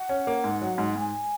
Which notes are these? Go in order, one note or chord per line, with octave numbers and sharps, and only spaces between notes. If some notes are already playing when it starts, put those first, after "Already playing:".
Already playing: F#5
C#4
A#3
G#2
F#3
G#2
G#2 G#5